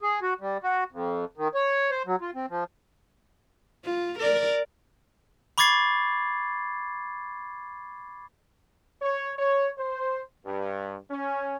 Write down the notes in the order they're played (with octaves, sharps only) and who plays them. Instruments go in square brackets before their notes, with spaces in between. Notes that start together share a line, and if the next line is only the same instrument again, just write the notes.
[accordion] G#4
F#4
G3
F#4
F2
D#3
C#5
C5
F#3
F4
C4
F3
[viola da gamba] F4
A#4 D5
[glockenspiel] B5 C#6 D6 G#6 A6 C7
[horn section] C#5
C#5
C5
G2
C#4